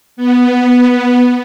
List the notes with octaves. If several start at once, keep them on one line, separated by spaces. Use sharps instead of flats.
B3